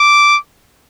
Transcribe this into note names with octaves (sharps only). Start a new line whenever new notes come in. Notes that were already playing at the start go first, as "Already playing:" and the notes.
Already playing: D6